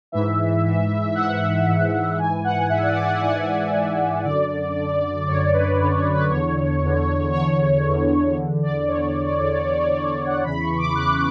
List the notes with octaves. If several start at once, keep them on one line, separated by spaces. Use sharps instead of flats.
G#2 E3 E5
G#2 E3
G#2 E3 F#5
G#2 E3
G#2 E3 G#5
F#5
G#2 E3 E5
D5
D5
E5
G#2 E3 F#5
G#2 E3
F#2 D3 D5
F#2 D3
F#2 D3 C#5
B4
F#2 D3 C#5
C#5
B4
E2 D3 C#5
E2 D3
E2 D3 C#5
E2 D3
E2 D3
D5
E2 D3 C#5
E2 D3
E2 D3
F#5
E2 C#3 E3 B5
C#6
D6
E2 C#3 E3 F#6